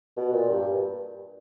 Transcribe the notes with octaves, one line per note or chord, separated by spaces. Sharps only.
B2
A#2
G2